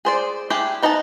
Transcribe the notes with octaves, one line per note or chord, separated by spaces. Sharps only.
G#4 C5 D5
D4 E4 G4 G#4 G5
B3 D#4 D#5 E5 A5